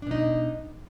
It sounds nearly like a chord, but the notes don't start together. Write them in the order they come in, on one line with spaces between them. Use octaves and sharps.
D4 B2 D#4